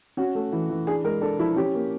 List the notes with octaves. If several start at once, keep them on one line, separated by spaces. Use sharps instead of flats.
C#4 F#4
A3
E3
E3
D4 G#4
G#3 A#4
D4 A4
F3 E4
C#4 G4
A#3